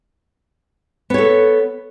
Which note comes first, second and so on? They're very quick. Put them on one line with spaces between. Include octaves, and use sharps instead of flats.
B3 C#5 A4